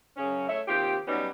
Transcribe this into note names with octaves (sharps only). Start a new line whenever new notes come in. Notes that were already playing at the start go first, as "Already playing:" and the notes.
F#2 C#3 C#4
A3 C#5 E5
D#2 C3 F4 G4
F#3 G3 B3 C#4 D#4